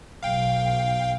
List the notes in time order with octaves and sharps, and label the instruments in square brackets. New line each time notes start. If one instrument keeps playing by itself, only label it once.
[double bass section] B1 [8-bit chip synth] F5 G5